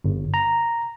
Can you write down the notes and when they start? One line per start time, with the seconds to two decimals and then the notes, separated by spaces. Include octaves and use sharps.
0.04 G1
0.34 A#5